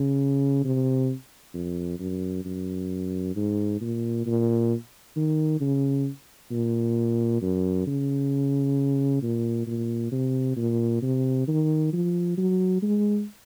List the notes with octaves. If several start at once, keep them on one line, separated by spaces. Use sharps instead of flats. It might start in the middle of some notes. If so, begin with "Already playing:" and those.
Already playing: C#3
C3
F2
F#2
F#2
G#2
A#2
A#2
D#3
C#3
A#2
F#2
C#3
A#2
A#2
C3
A#2
C3
D#3
F3
F#3
G#3